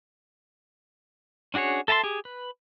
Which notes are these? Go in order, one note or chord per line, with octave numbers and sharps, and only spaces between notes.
C#4 D4 F#4 G#4 C#5
A4 E5 A5 A#5 C6
G4 G#4
B4